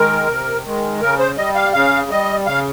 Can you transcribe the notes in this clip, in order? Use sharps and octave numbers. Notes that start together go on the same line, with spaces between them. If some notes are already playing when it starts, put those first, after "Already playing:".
Already playing: D#3 G#3 A#4
C3
D#3 G#3
C#3 A#4
C5
G3 D#5
F5
C#3 F5
G3 D#5
C#3 F5